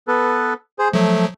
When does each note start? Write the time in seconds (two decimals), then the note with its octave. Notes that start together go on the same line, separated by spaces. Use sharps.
0.08 B3 A4 B4
0.79 G#4 C5
0.94 F3 F#3 A3